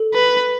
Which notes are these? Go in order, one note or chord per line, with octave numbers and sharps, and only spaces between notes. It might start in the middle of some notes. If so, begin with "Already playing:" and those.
Already playing: A4
B4